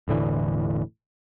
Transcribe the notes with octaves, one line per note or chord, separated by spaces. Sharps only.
E1 A2 D3 E3